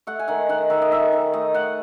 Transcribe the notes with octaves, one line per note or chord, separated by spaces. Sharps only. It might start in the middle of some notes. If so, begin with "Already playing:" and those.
A3 F#5
G#5
D#3 F#5
D#3 F#5
D#3 E5
D#5
D#3 E5
D#3
A3 D#5
A3 F#5